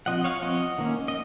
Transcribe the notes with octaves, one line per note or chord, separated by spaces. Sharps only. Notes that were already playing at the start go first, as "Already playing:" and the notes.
F3 C4 D#5 F#5
C#5 F5
F3 C4 D#5 F#5
D#3 A#3 C#4
D#5